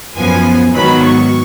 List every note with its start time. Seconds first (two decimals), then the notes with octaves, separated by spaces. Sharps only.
0.16 F#2 F3 B3 G#5
0.74 G#2 D#3 F#3 B3 B5
1.03 C#6